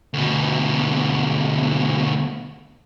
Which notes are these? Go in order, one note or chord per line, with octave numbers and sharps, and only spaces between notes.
D2 B2